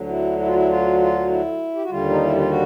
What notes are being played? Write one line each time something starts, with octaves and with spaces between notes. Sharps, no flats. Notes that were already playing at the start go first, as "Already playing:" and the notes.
Already playing: D2 D3 F#3
E4
E4
F4
E4
F4
F4
E4
G4
F#4
D#2 D3 G3 F4
D#4
E4
F4
F#4